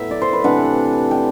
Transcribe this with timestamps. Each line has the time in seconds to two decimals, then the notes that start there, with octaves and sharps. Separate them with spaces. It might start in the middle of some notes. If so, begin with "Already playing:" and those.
Already playing: A2 F#3 B3 E5
0.11 D5
0.22 C5
0.33 B4
0.44 C3 E3 A3 D4 F#5
1.11 G5